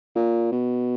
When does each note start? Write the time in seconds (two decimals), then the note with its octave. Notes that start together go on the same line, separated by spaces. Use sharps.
0.16 A#2
0.52 B2